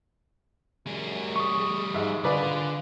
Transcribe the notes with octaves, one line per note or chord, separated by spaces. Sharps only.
F#2 G3 G#4
C#6 D#6
G#2 G#3 E5 F5
D3 F4 G#4 B4 D5